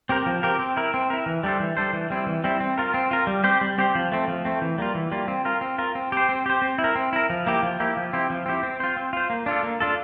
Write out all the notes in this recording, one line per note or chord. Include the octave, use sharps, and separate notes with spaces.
C4 G4 A#4
F3
C4 G4 A#4
C4
E4 A#4
C4
E4 A#4
E3
G3 D4 A4 C5
E3
G3 D4 A4 C5
E3
G3 C4 E4
E3
G3 C4 E4
C4
F4 A#4
C4
F4 A#4
G3
C4 G4 C5
G3
C4 G4 C5
F3
A3 C4
F3
A3 C4
E3
G3 A#3 F4
E3
G3 A#3 F4
C4
F4 A#4
C4
F4 A#4
C4
G4 C5
C4
G4 C5
C4
E4
A#4
C4
E4 A#4
F3
A#3 E4 G4
F3
A#3 E4 G4
F3
C4 E4 G4
F3
C4 E4 G4
C4
F4 C5
C4
F4 C5
A#3
D4 F4 A4
A#3
D4 F4 A4